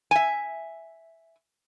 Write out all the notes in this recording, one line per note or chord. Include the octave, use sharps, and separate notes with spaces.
E5 G#5